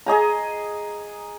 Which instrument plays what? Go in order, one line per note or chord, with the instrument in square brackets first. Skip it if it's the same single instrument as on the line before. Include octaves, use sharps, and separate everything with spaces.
[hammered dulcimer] G#4 D#5 G#5 A#5